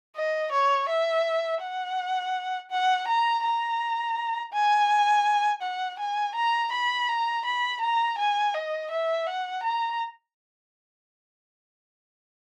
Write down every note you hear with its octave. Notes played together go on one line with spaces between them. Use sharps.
D#5
C#5
E5
F#5
F#5
A#5
A#5
G#5
F#5
G#5
A#5
B5
A#5
B5
A#5
G#5
D#5
E5
F#5
A#5